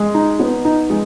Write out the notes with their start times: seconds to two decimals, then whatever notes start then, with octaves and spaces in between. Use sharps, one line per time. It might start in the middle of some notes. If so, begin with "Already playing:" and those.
Already playing: G#3
0.14 D#4
0.39 B3
0.65 D#4
0.90 G#3